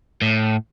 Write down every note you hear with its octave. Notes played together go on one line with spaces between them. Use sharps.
A2